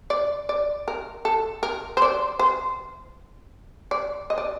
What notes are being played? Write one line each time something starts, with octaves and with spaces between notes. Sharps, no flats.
D5
D5
A#4
A4
A#4
C5
D5
C5
D5
D#5
D5